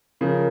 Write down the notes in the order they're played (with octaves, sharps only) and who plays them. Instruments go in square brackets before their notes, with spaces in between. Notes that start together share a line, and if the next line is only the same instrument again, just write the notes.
[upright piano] C#3 F3 [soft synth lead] A#4